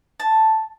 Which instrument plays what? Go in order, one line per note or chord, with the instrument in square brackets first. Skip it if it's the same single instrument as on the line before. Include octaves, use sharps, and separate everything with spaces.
[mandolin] A5